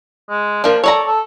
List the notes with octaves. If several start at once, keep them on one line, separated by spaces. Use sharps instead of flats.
G#3
F3 A#3 D4
A4 C#5 D5 A#5
A4